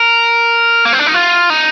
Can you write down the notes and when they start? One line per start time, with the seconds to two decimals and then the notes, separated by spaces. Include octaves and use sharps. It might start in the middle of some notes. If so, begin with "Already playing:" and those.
Already playing: A#4
0.85 A#3
0.93 C4
0.99 D4
1.07 D#4
1.14 F4
1.50 D#4